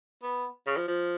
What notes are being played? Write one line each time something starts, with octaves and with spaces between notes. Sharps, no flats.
B3
C#3
F3
F3